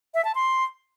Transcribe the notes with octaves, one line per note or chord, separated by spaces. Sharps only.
E5
A5
C6